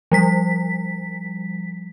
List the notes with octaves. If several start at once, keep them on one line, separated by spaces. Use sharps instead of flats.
F3 G3 B6